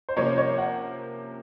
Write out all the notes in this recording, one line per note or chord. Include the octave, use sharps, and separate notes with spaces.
C5
C3 F3 A#3 C#4 C#5
C#5
F#5